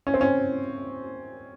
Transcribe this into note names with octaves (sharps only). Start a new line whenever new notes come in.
C#4
C4
C#4